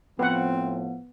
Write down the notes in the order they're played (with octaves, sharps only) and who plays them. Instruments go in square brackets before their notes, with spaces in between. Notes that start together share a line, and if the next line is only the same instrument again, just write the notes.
[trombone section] A2 F3 [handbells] B3 [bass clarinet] C4 [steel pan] B4 F#5